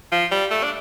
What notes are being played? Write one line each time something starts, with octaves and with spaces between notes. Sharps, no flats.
F3
G3
A3
D4